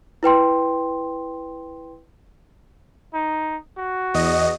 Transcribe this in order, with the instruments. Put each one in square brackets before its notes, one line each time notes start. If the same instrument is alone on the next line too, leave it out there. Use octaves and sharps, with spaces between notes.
[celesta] E4 B4 G5 C6
[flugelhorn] D#4
F#4
[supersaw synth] E2 D#5